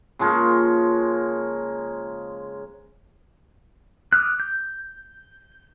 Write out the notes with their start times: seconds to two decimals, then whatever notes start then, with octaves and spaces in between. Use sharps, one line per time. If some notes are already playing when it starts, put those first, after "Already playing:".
0.19 C#3 F3 G#3 A#3
4.13 D6 D#6 F6 F#6
4.40 G6